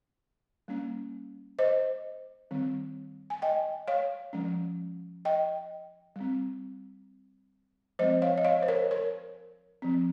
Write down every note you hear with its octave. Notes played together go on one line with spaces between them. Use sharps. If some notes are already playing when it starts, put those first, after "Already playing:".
G3 A#3 C#4
C5 D#5
D#3 G3 C4
G#5
D#5 G5
C#5 F5
F3 G#3 C#4
D#5 G5
G3 C4
F3 G#3 C4 C5 D#5
C#5 F5
D#5
C#5 F5
C5
A#4 C#5
A#4 C#5
F3 C4